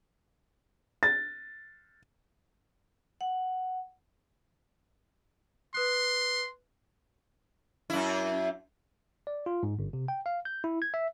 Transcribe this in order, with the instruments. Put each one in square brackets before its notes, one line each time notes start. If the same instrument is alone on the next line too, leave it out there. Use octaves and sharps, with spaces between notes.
[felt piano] A6
[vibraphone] F#5
[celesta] B4 D#6 F#6 [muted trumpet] C6
[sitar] F#2 E4
[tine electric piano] D5
F4
G#2
G1
C3
G5
F5
G6
E4
G#6
E5